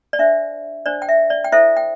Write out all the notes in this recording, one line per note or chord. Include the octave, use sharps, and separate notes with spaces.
D5
D4 C5 E5
D4 C5 D5
G5
E5
D5
G5
E4 A4 C5 E5
G5